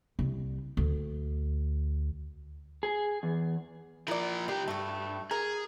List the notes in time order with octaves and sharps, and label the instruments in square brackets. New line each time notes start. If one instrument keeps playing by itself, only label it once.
[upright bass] C2
D2
[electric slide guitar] G#4
E2
[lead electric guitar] F3 A#4 [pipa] E4 D5
[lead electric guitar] C2 G4 [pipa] D4
[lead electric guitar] G2 [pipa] A3 F#4
[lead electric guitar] G#4 [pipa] A#4